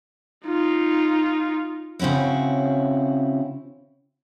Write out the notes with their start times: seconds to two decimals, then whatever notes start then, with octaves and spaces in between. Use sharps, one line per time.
0.45 D#4 F4
1.99 C#3 C4 C#4 E4 F#4